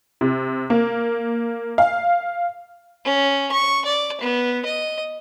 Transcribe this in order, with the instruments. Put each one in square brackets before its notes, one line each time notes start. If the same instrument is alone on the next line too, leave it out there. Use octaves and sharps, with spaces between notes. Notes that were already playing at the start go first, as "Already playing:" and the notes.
[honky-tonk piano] C3
A#3
F5
[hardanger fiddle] C#4
C#6
D5
B3
D#5